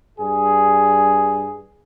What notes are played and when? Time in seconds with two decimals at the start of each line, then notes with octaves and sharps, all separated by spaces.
0.18 G2 G#4